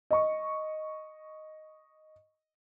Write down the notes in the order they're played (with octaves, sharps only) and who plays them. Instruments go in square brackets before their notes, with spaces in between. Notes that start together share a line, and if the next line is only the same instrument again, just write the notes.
[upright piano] D#5 C#6